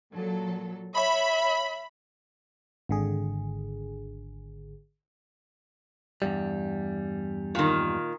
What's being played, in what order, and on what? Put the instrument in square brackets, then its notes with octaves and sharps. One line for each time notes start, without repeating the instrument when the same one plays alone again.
[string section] A#2 F#3 A4
[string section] C#5 [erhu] E5 [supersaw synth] B5
[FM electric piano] G#1 D3 G#4
[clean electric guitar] E2 G2 G3
[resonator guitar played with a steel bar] A#2 D#3